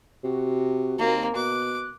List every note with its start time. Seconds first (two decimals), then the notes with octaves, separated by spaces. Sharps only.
0.24 C3 F#4
0.98 D#2 A#3 C4
1.35 B2 D6 F#6